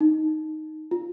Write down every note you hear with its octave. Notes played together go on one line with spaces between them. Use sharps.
D#4
F4